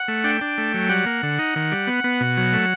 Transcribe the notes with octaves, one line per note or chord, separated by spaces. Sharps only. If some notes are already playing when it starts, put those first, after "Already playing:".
Already playing: F#5
A3
D4 G5
D4
A3
F#3
G3 F#5
A#3
D3
D#4
D#3
G3
B3
B3
B2
F#3
A3